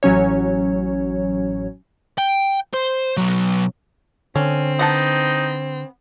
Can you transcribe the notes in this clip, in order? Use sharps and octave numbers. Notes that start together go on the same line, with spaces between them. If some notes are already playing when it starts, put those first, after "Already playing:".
A1 F#3 C#4 C#5
G5
C5
B2 F#3
D3 C4 C#4
B3 D#4 F#5 A5